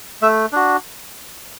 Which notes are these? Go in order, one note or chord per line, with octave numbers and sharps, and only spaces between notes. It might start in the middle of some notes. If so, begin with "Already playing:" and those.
A3 E5
D4 F#4